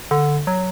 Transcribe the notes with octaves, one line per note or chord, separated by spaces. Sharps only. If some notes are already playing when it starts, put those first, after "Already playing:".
D3
F#3